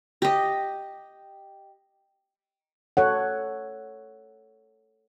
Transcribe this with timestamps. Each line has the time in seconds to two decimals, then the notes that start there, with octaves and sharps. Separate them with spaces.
0.22 G4 D#5
2.97 A4 C#5 F#5